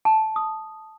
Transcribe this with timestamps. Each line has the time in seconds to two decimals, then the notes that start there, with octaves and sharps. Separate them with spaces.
0.05 A5
0.36 D#6